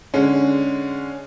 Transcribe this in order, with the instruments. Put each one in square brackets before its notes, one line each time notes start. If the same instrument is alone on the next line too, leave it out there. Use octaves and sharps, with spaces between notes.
[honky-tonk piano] D3 G#3 C#4